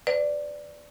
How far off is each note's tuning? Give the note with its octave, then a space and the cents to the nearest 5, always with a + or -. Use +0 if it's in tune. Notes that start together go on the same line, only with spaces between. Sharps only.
B4 +40 D5 +0